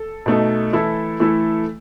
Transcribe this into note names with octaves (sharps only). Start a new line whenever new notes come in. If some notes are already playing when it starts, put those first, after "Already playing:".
Already playing: A4
B2 A3 D#4 A4
E3 A3 E4 A4
E3 A3 E4 A4